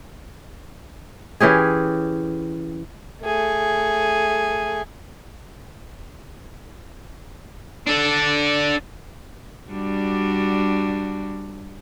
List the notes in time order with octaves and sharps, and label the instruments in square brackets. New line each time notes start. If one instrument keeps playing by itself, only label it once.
[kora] E3 C#4 G4 G#4
[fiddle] A3 G#4
[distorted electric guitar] D4 A4
[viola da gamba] G3 D4 F#4